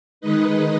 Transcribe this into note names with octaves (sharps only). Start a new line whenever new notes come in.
D#3 G#3 D#4 B4 D#5